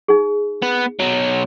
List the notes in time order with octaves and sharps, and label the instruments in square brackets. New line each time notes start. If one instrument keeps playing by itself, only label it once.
[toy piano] D#4 G#4
[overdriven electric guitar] B3
B2 F#3